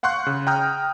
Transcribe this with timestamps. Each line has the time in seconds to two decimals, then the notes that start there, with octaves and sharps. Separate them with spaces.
0.03 F5 F#5 C6 C#6 F#6 G6
0.27 C#3
0.47 G5 A#5 D#6 F6 G6